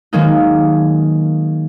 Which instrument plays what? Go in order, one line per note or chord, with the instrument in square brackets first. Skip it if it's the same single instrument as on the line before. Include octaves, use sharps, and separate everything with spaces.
[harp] D#3 F#3 G#3 A#3 C#4 D#4